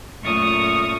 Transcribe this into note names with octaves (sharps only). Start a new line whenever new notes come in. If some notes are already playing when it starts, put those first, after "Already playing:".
F#2 A#2 A3 C#6 D#6 F6